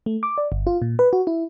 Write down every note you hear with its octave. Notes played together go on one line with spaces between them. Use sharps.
A3
D6
D5
G1
F4
A#2
B4
F#4
E4